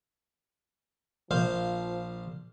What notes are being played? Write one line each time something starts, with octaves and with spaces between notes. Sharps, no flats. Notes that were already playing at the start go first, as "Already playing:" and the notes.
A#1 F3 C5 F5